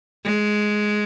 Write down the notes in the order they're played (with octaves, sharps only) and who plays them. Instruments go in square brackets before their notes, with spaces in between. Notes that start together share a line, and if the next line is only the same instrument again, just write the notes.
[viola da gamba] G#3